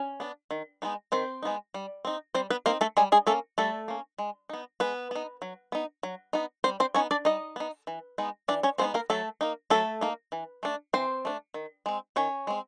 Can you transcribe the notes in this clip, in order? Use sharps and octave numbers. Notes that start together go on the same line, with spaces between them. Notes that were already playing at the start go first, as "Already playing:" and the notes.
Already playing: C#4
B3 D4
D#3
G#3 B3 D#4
D#3 C4 C5
G#3 B3 D#4
G3
C4 D#4
G3 C4 C5
B3 B4
A#3 C4 D#4 A#4
A3 A4
G3 G#3 G#4
G#3 G#4
A3 A#3 C#4 A4
G3 A3 A4
A#3 C#4
G#3
B3 D#4
G#3 B3 B4
B3 D#4
F#3
B3 D#4
F#3
B3 D#4
G3 C4 C5
C4 C5
B3 C#4 D#4 C#5
D4 D5
G3 D#4 D#5
B3 D#4
E3
G#3 B3 D#4
E3 D4 D5
C#4 C#5
G#3 B3 C4 D#4 C5
A#3 A#4
F#3 A3 A4
A#3 D#4
F#3 A3 A4
A#3 D#4
E3
A3 D4
E3 C4 C5
A3 D4
D#3
G#3 C4
D#3 C#4 C#5
G#3 C4